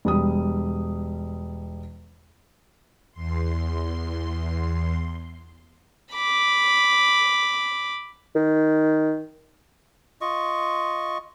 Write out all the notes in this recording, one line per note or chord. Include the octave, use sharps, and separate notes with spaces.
E1 G3 D#6
E2 C6
B5 D6
D#3
F4 D#5 C#6